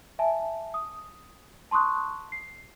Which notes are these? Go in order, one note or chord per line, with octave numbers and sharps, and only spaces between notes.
E5 G#5 A5
D#6
A5 C6 C#6 D#6 F#6
C7